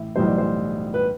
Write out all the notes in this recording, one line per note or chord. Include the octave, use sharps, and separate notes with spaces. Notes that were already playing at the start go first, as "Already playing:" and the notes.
Already playing: A2 E3 E5
B1 A2 E3 G3 C5
D5
C5
B4